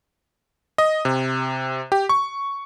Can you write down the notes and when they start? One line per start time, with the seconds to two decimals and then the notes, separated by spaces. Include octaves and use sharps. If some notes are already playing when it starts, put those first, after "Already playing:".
0.78 D#5
1.05 C3
1.92 G4
2.09 C#6